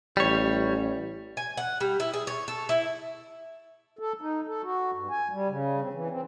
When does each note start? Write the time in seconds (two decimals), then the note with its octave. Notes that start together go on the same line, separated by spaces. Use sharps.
0.17 A1 G3 C#5
1.37 G#5
1.57 F#5
1.81 G3
2.00 E4
2.13 G#4
2.27 C#5
2.48 A4
2.69 E4
3.99 A4
4.21 D#4
4.47 A4
4.63 F#4
4.92 G2
5.11 G#5
5.31 G3
5.48 C#3
5.81 C4
5.93 E3
6.11 C4